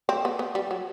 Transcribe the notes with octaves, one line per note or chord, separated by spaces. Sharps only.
C4
B3
B3
G3
F#3